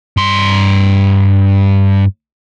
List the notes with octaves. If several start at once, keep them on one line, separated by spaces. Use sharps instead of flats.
G2 C6